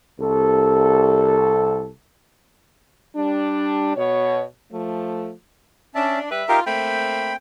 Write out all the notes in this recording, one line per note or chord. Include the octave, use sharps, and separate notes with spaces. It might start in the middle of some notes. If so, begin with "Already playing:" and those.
C2 A4
G3 D4
B2 C#5
F3 A3
C#4 D4 E5 A5
G3 B4 E5
D#4 F4 G4 A#4
A3 A#3 C4 G5 B5